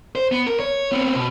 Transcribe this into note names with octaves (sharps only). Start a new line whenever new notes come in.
C5
B3
A#4
C#5
B3 C4
B2